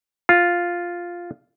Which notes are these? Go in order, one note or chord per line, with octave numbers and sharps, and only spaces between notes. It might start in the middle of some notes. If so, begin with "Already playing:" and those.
F4